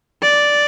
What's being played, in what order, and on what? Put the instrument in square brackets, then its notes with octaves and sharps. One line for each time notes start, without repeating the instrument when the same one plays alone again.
[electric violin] D5